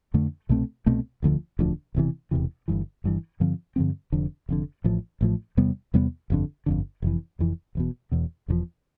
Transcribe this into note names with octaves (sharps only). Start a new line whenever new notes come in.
F2 D3 A3
C2 B2 A3 C4
C2 B2 A3 C4
E1 D2 D3 F3
E1 D2 D3 F3
E1 E2 C3 E3
E1 E2 C3 E3
G1 G2 E3
G1 G2 E3
G2 D3 F3 C4
G2 D3 F3 C4
F1 F2 D3
F1 F2 D3
A1 A2 F3
A1 A2 F3
E2 C3 G3 B3
E2 C3 G3 B3
G1 F2 D3
G1 F2 D3
F1 F2 E3
F1 F2 E3
E1 E2 B2
E1 E2 B2
E1 E2 D3 F3